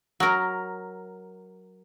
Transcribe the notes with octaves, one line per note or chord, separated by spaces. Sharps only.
F#3 A#4